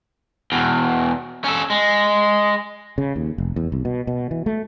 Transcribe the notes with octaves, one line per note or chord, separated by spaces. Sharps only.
E2 B2
C#4 A4
G#3
C#3
D#2
F1
E2
C2
B2
B2
E3
A3